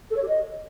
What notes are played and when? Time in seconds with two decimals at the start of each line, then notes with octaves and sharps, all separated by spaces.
0.10 A4
0.16 C#5
0.22 G4
0.28 D#5